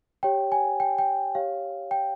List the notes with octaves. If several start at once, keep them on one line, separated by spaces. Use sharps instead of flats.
G4 C#5 G5
G#5
G5
G5
G4 C#5 F5
G5